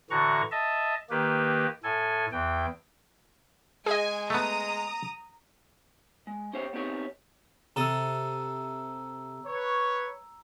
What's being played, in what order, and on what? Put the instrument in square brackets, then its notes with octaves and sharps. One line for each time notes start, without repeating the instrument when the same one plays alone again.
[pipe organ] A2 D3 E3 F#4 A#5 C#6
D#5 E5 A5
D#3 A#3 G4 B4
A2 A4 G#5
E2 E3 G5
[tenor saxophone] G#3 [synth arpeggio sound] G#4 D#5 [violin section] G#5
[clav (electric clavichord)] A3 B3 [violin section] A#5 D#6
[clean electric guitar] G#3
C#4 G4 C5 C#5 G5
B3 C4 D#4 G4 C#5
[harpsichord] C3 A4 D#6 [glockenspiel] A#5 E6
[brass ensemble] B4 C#5